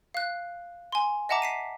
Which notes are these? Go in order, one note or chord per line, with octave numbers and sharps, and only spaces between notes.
F5 F#6
G#5 C6
D#5 E5 F#5 A5 A#5 D6
B6 C7 D#7